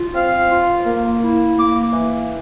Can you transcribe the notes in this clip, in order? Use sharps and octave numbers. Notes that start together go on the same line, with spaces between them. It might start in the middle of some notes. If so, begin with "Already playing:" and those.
Already playing: F4
C4 F5
F4
A#3
E4
A#3 D6
E3